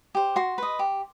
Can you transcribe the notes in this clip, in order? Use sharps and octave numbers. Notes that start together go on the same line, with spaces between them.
G4 C5
F#4 C6
B4 D#5
G4